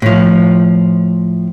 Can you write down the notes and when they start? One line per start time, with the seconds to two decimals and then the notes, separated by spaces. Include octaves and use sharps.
0.02 A2 F3